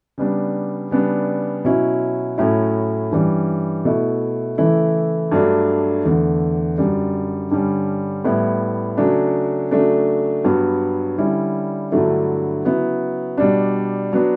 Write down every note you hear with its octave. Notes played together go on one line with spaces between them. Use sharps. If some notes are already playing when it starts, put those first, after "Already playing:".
C#3 G3 B3 D4
C#3 G3 B3 D4
B2 F#3 C#4 E4
A2 F#3 A3 C#4 E4
G2 E3 G3 C#4
B2 A3 E4
C#3 E3 A3 E4
G2 F#3 A3 D4
E2 D3 A3
F#2 D3 G3
G2 D3 G3 C#4
A2 G3 B3 E4
C#3 F#3 A3 D4
C#3 F#3 A3 D4
G2 F#3 B3
D3 G3 C#4 E4
G2 D3 F#3 A3 E4
C#3 F#3 B3 E4
B2 G3 D4
F#3 B3 D4